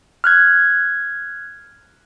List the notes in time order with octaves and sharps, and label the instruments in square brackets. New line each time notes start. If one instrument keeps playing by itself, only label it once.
[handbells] F6 F#6 G#6